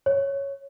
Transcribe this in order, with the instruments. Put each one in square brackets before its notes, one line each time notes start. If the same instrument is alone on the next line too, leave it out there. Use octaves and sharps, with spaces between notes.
[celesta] C#5